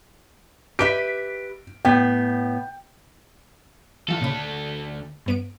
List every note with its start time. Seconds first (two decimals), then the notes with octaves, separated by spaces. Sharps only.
0.79 G4 B4 E5 D7
1.85 A2 B3 G5
4.08 D2 E3 F4 A4
4.21 A#2 C#3 B5
5.26 G2 B3 D7